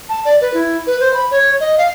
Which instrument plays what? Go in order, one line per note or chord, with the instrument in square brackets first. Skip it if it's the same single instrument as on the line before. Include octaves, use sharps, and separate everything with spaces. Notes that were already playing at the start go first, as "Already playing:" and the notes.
[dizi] A5
D5
B4
E4
B4
C5
B5
C#5
D#5
F5